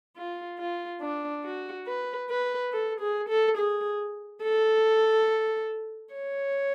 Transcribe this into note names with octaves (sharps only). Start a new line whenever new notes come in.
F4
F4
D4
F#4
B4
B4
A4
G#4
A4
G#4
A4
C#5